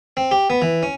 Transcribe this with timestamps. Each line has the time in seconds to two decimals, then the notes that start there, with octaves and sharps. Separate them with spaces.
0.17 C4
0.31 G4
0.50 B3
0.62 E3
0.83 C#4